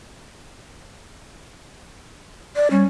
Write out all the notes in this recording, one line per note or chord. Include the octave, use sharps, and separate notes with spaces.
D5
G3 C#4